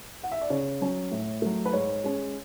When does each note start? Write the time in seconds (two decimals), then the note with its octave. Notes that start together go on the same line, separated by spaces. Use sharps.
0.23 F#5
0.32 E5
0.42 D5
0.50 C#3 C#5
0.81 F#3 C#4
1.11 A2
1.42 F#3 A3
1.65 B4
1.73 G#2 C#5
2.04 G#3 C#4